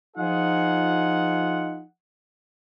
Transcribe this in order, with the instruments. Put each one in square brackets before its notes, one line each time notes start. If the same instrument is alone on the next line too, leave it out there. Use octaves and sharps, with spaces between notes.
[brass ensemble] F3 D#4 F4 G#4 F#5